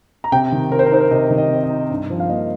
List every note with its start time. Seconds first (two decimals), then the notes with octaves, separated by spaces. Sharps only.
0.24 A#5
0.32 C3 G5
0.52 D#3
0.72 C4 A#4
0.79 C5
0.86 A#4
0.91 D#4 C5
1.01 A#4
1.11 C3 D#5
1.30 D#3
1.38 D#5
1.50 C4
1.64 D#5
1.70 D#4
1.90 G2
2.10 F3
2.20 F5
2.29 A#3 D#5